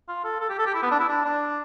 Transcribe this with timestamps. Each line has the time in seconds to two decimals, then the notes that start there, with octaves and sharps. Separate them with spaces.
0.08 F4
0.24 A4
0.40 A4
0.49 G4
0.58 A4
0.66 G4
0.74 E4
0.83 B3
0.91 D4
1.00 E4
1.08 D4
1.25 D4